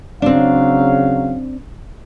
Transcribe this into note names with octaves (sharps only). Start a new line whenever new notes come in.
C#3 F#3 C4 D4 F5